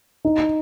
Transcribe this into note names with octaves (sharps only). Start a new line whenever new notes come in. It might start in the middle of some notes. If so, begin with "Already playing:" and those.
D#4